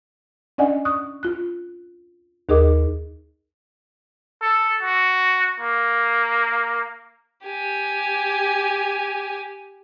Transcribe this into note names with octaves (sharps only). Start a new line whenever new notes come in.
C#4 D4 D5 D#5 F#5 G#5
C#6 D#6 F#6
F4 F#6
D#2 D#4 G#4 A#4 D#5 D6
A4
F#4
A#3
G4 G#5